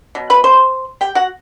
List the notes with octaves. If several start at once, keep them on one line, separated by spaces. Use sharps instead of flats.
B2 F#3
B4 B5
C5 C6
G4 G5
F#4 F#5